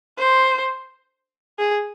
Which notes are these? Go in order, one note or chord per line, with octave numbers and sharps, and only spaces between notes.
C5
G#4